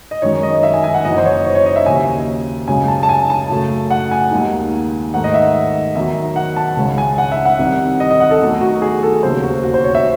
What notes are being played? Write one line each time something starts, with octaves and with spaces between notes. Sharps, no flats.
D#5
F#2 D#3 G#3 C#5
D#5
E5
G#5
G#5
F#5
F#1 F#2 E3 D#5
C5
C#5
C#5
C#5
D#5
E5
D#2 C#3 F#3 G#5
F#2 C#3 G#3 G#5
A5
A5
G#5
A5
F#2 C#3 F#3 A3
F#5
G#5
D#2 D#3 G#3 D#4
G#2 D#3 A3 D#4 F#5
D#5
E5
E2 D#3 F#3 E5
F#5
A5
C#2 C#3 G#3 C#4
G#5
F#5
E5
F#5
C2 C3 D#3
D#5
D#5
F#5
A4
E2 D#3 F#3 A3
F#4
G#4
A4
E1 D#2 C#3 F#3 C5
F#4
F#4
C5
C#5
E5